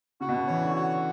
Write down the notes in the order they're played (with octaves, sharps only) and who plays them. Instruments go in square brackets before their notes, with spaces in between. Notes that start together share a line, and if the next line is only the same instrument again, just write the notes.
[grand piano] C#3 [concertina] F#4
[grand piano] B2
C#3
[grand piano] E3 [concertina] C#5
[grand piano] D3
[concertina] F#4